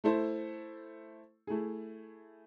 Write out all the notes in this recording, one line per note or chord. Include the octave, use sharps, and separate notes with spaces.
A3 E4 A4 C5
A3 E4 G#4